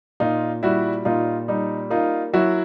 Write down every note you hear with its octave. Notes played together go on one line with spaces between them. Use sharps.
A#2 D#4 F4
G3 E4 F#4
A#2 D#4 F4
G3 D#4
A#3 D#4 F4
F#3 E4 F#4